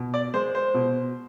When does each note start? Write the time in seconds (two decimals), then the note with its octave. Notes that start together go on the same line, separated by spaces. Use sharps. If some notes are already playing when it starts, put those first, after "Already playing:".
Already playing: B2
0.14 D5
0.34 G#3 C5
0.55 C5
0.74 B2